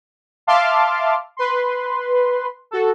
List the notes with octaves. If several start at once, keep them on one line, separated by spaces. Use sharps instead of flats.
E5 F5 A5 C6 D6 F6
B4 C6
F#4 A4